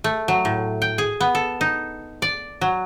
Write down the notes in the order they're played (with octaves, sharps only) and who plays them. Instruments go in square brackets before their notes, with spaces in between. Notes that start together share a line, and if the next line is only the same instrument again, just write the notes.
[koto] A3
F#3
A2
G5
G#4
B3
A4
D#4
D5
F#3